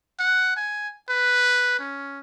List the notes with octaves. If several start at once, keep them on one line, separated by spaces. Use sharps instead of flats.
F#5
G#5
B4
C#4